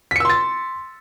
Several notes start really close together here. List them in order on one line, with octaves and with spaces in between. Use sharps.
B6 C#7 E6 C6 A6